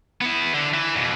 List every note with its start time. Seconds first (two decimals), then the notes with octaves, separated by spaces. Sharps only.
0.21 B3 E4
0.54 D3
0.74 E3
0.96 F2 B2